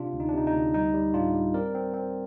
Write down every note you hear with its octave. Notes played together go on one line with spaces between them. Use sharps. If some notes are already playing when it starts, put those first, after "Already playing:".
Already playing: C3 D4 F4
D2
D#4
D4
C3 D#4
D#4
D2
G3 D#4
G3
A2 D4 F4
G3
C4 A#4 D5
C4
C4